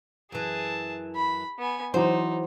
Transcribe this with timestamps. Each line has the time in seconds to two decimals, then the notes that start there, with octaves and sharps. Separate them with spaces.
0.32 F#2 E3 G#4 A5
1.16 B5
1.58 B3 G#5
1.94 E3 F#3 D#4 C5